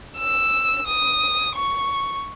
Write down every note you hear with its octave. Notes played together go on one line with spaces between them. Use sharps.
E6
D#6
C#6